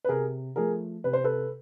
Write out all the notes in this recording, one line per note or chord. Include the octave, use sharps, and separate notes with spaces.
B4
C3 G#4 A#4
F3 A3 G#4 A#4
C3 B4
C5
A4 B4